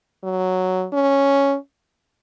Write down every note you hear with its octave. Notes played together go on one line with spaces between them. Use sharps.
F#3
C#4